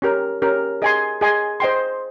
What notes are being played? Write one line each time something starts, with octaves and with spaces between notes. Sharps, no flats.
C#4 G4 A#4
C#4 G4 A#4
G#4 D#5 G#5 C6
G#4 D#5 G#5 C6
C5 D#5 G5 C6